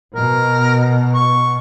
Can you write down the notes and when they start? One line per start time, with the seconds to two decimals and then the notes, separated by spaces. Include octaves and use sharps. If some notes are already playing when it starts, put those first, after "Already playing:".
0.16 B2 A#4
1.14 C#6